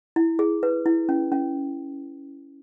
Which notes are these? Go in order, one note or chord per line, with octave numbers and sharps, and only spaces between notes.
E4
G#4
B4
E4
C#4
C#4